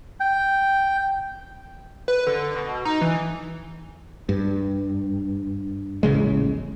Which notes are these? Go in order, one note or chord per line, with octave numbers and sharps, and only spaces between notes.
G5
B4
D3
B2
D#4
E3
G2
D#1 A1 C#3 G#3